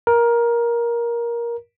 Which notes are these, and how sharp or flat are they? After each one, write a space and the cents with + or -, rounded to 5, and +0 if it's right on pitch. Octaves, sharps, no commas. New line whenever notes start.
A#4 +15